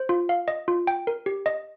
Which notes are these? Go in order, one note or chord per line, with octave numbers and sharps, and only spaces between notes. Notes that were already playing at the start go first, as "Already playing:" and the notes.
Already playing: C5
F4
F5
D#5
F4
G5
A#4
G4
D#5